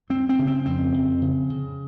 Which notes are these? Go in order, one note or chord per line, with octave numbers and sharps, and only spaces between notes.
F#2 C4
C4
C#3
C4
F2 C4
F2
C#3
C#3